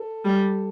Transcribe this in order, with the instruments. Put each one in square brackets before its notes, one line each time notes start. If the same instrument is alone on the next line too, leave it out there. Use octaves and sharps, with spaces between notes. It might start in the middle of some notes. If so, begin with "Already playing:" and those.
Already playing: [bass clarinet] A4
[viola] G3